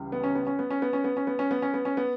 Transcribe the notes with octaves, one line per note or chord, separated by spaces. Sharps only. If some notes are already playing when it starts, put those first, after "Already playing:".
Already playing: C#2 C#3 E3 G3
B3
C#4
B3
C#4
B3
C#4
B3
C#4
B3
C#4
B3
C#4
B3
C#4
B3
C#4
B3